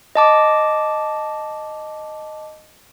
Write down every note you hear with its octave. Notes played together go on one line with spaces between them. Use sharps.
D#5 A5 D6